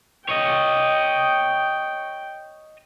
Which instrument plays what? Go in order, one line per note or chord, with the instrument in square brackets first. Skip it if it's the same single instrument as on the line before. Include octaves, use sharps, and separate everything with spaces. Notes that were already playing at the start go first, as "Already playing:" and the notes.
[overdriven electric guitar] C#5 D#5 [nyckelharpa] G5